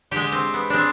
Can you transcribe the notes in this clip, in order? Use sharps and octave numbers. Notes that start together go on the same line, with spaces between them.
D3 G#3 G4
C4
B3
G#3 C4 D4